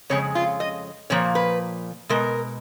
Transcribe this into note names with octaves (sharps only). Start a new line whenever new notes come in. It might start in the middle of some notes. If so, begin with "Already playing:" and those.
F2 C#3 G#3 C#5
F4
D#5
A#2 F3 A#3 C#5
B4
B2 G#3 A#4